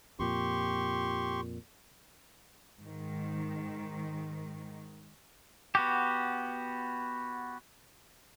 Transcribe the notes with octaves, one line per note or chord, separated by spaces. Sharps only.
F2 A#2 G4 C6 C#6
G#2 D#3
B3 F#4 G4